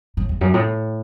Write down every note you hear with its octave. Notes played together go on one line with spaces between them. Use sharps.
A2
E2
F#2
A2